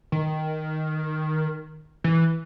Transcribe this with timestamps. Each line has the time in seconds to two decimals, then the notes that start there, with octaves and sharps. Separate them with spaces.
0.12 D#3
2.04 E3